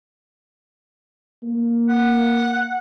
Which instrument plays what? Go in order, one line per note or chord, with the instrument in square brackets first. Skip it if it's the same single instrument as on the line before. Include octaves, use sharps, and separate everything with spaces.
[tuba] A#3
[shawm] F#5